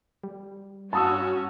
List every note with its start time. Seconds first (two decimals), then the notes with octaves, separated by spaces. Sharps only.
0.24 G3
0.93 G2 C#4 F#4 A5 D#6 E6